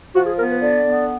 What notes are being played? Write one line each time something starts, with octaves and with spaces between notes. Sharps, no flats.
F3 F#4
G#4
B3 A#4
B4
D3 D5
B3